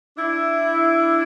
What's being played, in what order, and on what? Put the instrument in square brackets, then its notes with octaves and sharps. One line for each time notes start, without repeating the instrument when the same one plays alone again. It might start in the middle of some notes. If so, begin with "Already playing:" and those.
[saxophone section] D4 E4